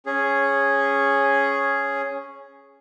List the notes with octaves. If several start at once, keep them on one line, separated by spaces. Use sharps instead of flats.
C#4 G#4